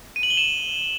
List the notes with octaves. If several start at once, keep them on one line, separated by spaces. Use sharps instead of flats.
D#7
F#7
G7
E7